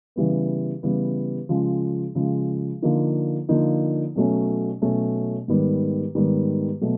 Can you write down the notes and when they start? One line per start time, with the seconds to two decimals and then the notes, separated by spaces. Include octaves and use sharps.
0.16 C#3 E3 G3 B3
0.83 C#3 E3 G3 B3
1.49 C#3 F3 G#3
2.15 C#3 F3 G#3
2.82 D3 F3 A#3 D#4
3.49 D3 F3 A#3 D#4
4.16 B2 F#3 A3 C#4
4.82 B2 F#3 A3 C#4
5.48 G#2 D#3 G3 B3
6.15 G#2 D#3 G3 B3
6.81 B2 F#3 A3